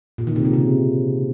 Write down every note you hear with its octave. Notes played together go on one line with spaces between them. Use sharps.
A#2
D#3
C3
C#3
C3